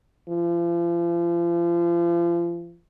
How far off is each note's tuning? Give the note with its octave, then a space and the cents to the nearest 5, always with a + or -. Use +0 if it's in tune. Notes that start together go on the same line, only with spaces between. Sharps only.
F3 -35